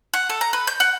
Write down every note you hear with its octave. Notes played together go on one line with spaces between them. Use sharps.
F#5
A4
A#5
B4
G6
F#5